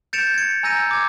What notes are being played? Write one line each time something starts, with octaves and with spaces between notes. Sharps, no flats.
G6 A6 C#7 D7 E7 F7
G#6 C#7
G#5 A#5 E6 G6 A#6 D#7
D6 G#6